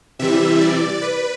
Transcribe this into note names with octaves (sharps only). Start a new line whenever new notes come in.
C3 E3 G3 E5
D5
B4